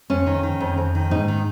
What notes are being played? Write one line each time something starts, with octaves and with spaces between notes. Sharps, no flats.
F2 C#4
D#3
D#3
F2
F2
D#3
G#2 D#4
D#3